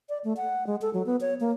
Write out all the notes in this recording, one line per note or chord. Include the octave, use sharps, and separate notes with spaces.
D5
A3
F#5
G#3
A4
F#3
B3
C#5
A#3